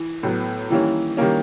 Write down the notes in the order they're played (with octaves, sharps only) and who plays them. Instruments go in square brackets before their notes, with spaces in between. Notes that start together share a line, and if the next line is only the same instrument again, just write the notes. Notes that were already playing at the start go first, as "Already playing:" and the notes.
Already playing: [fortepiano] E3
[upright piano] A2 F#3 B3
[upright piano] D#3 G3 A#3 C#4 [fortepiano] E3
[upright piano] D#3 G3 A#3 C#4